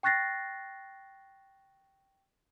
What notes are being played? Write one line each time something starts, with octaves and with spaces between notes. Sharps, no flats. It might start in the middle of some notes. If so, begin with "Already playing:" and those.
G5 C#6 F#6 A6 A#6 C7